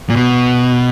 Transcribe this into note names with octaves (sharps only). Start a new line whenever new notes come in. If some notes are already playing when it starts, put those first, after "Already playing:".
A#2
B2